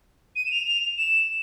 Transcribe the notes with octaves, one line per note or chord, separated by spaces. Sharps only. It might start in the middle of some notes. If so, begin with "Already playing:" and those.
D#7
E7
F7
F7
E7